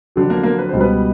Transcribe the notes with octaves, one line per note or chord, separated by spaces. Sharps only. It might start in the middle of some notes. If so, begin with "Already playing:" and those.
F2 D3 F#3
A#3 A#4
A#3 A#4
B4
C#2 B2 G3 C5
B3 B4